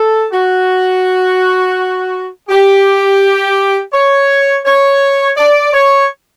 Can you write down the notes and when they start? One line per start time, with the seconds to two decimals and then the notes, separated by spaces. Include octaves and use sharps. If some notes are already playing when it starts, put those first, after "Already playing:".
Already playing: A4
0.33 F#4
2.49 G4
3.93 C#5
4.65 C#5
5.37 D5
5.73 C#5